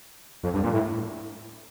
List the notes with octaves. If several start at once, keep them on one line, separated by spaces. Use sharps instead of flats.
F2
G2
A#2
A2